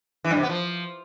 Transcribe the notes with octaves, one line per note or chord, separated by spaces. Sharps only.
E3
G2
C3
B3
F3